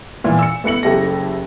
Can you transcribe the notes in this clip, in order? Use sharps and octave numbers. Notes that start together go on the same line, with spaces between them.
A#2 E3
E6 C#7
A3 B3 E4 C#7 F#7
F#1 E4 G4 A4 A#6